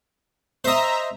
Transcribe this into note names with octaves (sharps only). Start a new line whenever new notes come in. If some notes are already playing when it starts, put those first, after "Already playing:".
C5 D#5 E5 A#5